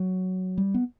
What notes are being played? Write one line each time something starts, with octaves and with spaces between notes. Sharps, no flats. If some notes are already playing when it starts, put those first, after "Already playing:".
Already playing: F#3
G3
B3